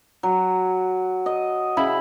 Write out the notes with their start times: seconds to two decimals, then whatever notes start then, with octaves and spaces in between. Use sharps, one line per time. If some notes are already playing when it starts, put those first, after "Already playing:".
0.23 F#3
1.26 D#5
1.77 C#3 E4 B5